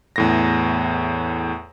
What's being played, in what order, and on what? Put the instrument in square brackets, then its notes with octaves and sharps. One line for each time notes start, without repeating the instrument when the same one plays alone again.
[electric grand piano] E2 A2 A#6